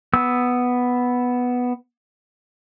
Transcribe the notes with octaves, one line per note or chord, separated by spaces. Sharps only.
B3 E6